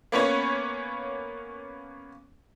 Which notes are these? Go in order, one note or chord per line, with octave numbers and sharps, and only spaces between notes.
A#3 B3 C#4 C#5